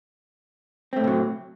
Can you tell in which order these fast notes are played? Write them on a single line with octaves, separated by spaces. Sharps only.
C4 A3 A2 C3 F#3